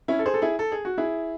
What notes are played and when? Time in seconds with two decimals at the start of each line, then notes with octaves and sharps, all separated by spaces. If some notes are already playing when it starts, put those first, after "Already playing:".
0.08 C#4 E4
0.19 A4
0.26 G#4 C5
0.34 A4
0.42 E4 G#4
0.59 A4
0.72 G#4
0.85 F#4
0.98 E4 G#4